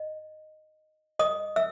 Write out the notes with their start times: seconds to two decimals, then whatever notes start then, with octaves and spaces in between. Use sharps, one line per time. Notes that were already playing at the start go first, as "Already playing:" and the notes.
Already playing: D#5
1.19 D#5 D#6
1.56 E5 E6